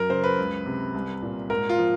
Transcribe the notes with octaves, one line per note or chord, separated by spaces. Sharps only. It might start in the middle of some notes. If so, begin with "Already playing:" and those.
Already playing: F#2 A#4
C#3 C5
B4
C#2
C3
C2
A#2
G#2 A#4
F4
F3